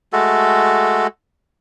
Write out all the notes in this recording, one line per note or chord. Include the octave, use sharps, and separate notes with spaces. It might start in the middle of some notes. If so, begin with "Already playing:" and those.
G#3 A3 F#4 A4